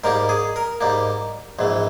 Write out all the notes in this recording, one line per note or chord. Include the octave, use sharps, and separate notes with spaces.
G#2 G3 A#3 A#4
G#4
A#4
G#2 G3 A#3
A#1 G#2 E3